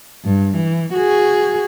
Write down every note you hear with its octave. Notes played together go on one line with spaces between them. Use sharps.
G2
E3
F#4 G#4